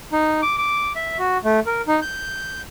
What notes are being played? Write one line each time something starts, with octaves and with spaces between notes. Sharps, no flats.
D#4
D6
D6
E5
F#4
A3
A#4
D#4
G6